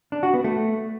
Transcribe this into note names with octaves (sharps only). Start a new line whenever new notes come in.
D4
F#4
B3
A3